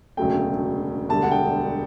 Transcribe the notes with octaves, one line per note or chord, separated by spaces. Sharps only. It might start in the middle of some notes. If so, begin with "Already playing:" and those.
E1 D2 C#3 F#3 A3 G5
E1 D2 D3 G3 A5
F#5
G5